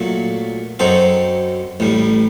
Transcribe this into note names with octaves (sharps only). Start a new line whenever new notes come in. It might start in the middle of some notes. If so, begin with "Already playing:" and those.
Already playing: A#2 F#3 A3
F#2 F#3 C4 D#4 A4
A1 A2 G3